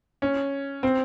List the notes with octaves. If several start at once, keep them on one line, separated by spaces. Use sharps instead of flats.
C#4
C4